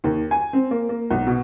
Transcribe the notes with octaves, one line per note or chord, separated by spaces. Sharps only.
D#2
G#5
C4
A#3
A#3
B1
B2